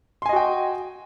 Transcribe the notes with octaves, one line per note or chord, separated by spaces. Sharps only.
F#4 D#5 G5 G#5 C6